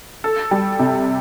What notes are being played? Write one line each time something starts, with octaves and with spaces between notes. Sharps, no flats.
A4
G3
C3